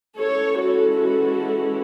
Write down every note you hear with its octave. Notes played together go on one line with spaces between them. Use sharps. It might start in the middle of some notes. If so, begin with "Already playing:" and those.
E3 G#3 C#4 E4 A4 C#5
F#4 A4
F#4 A4